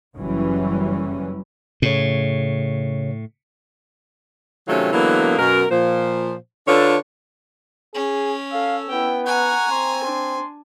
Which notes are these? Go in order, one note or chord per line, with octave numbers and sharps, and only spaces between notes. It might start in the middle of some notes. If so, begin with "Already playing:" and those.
F#1 F#2 E3 F#3 G3 C#4
A2 C#3 C#5
C3 D#3 F#3 A3 C#4 F4
D3 E3 F#3 G#3 A#3 B3
F#2 B2 A#4
A#2 F3 C5
D3 D4 F4 A4 B4 C#5
C#4 G#4
A4 F5 E6
B3 E4 G5
F#5 G#5 A#5 C#6
C4 C6
D4 C6